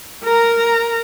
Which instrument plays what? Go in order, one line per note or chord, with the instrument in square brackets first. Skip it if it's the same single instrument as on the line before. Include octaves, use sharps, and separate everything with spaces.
[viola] A#4 A#5